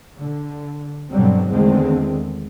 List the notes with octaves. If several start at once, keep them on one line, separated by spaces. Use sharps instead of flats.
D3
G2 B2 D3 F#3 G3 C4
E2 D3 D#3 G#3 A3 C4